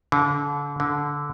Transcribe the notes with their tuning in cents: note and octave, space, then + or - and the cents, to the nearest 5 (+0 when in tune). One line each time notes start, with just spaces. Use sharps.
D3 -35
D3 -15